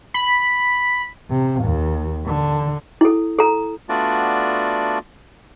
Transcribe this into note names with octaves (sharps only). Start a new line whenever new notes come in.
B5
C3
D#2
D3
E4 A4
A4 A#5
A3 B3 D4 F4 F#4 D5